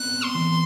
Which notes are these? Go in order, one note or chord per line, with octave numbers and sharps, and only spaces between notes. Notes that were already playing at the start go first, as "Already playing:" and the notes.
Already playing: B3 C4 F#6
B3
C6
E3